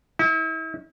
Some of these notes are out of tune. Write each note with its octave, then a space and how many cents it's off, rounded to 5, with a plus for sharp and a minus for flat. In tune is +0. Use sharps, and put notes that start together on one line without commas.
E4 -40